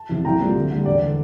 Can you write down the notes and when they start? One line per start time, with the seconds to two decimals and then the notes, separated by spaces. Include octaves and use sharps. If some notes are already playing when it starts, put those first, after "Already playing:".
Already playing: A5
0.09 E2 C3
0.25 C2 G5 A#5
0.40 A#2 G3 C4
0.55 D2
0.71 D3 G3
0.86 E1 D5
1.02 D3